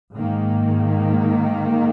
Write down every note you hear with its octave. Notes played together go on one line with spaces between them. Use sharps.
G#2 D#3 A#3